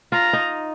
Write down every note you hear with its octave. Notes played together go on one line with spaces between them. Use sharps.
F4 A#5
D#4